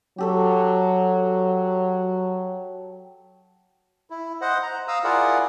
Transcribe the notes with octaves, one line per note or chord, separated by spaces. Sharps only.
F#3 G4 A4 C#5
E4
C5 D#5 F#5
A#5
F5 A#5 D#6 E6
E4 F4 G#4 A#4 D5 F#5